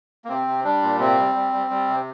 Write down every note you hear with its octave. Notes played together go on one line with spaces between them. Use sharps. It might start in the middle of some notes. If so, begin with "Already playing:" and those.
A#3
C3 C4
C3
G3 D4
A#2
C3 C4
G3
G3
G3
G3
C3